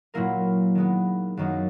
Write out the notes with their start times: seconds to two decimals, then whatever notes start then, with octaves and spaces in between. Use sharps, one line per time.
0.14 A#2 F#3 A#3 E4 A#4
0.75 D#3 G#3 B3
1.37 F#2 D#3 F#3 A#3 D#4